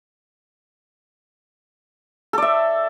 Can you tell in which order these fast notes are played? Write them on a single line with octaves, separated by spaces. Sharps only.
A4 D5 E5